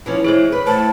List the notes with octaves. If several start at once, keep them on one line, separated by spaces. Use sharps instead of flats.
E3 F3 C#4
E3 G#3 G#4 C5 C#5
B4
A2 C5 A5